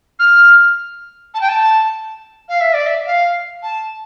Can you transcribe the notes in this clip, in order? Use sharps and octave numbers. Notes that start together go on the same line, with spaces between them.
F6
A5
G5
A5
F5
E5
D5
E5
F5
A5